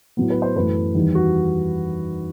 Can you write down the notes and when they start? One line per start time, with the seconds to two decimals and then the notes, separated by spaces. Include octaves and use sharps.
0.17 A2 F#3 B3
0.30 B4
0.42 C5
0.56 F#2 E3 A3 B4
0.95 E2 D#3 G3
1.15 F#4